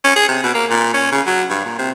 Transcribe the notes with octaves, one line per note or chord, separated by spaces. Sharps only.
C#4
G#4
C3
B2
A#3
A#2
C#4
C#3
F#3
G2
A#2
C3